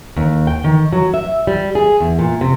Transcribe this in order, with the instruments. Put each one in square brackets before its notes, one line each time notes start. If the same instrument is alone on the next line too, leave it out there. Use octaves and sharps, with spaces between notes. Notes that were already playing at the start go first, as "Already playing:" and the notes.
[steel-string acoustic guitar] D#2
G5
D#3
F#3
E5
G3
G#4
E2
A#2
C3